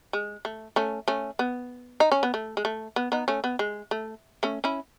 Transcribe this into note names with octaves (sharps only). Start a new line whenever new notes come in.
G#3
A3
A3 C#4
A3 C#4
B3
D#4
C#4
B3
A3
G#3
A3
B3
B3 D#4
A3 C#4
B3
G#3
A3
A3 C#4
C#4 E4